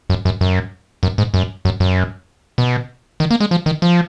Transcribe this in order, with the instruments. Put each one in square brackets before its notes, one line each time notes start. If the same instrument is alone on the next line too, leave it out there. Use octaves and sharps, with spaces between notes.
[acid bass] F#2
F#2
F#2
F#2
G#2
F#2
F#2
F#2
B2
D#3
A#3
G#3
F3
D#3
F3